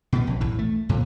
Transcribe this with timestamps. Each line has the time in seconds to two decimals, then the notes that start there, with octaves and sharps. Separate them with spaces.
0.13 B2 B3
0.27 A#1
0.40 B1 E2 A2
0.59 A3
0.89 F2 A#2 D3